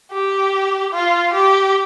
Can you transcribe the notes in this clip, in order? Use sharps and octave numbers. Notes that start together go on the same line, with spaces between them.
G4
F4
G4